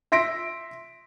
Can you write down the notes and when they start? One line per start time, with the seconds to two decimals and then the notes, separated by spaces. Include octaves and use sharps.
0.12 E5 C6 A#6 B6 D7